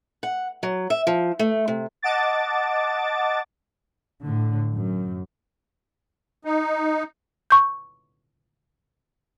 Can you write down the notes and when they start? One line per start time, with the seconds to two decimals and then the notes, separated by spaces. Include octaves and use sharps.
0.23 F#5
0.63 F#3
0.90 E5
1.07 F3
1.39 A3
1.68 C3
2.02 D#5 F#5 A5 D6 A6
4.23 A2 D3
4.74 F#2
6.45 D#4
7.50 C#6 G6